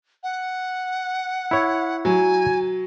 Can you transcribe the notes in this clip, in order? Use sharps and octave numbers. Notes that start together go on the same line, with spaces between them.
F#5
E4 C#5
F#3 G#5